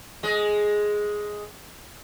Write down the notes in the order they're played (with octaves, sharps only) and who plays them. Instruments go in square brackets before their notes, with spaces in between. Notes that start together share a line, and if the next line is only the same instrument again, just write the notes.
[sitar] G#3 D#5